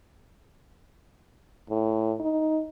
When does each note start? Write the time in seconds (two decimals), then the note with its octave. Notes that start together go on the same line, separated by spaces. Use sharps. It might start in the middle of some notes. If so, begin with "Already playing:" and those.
1.70 A2
2.20 D#4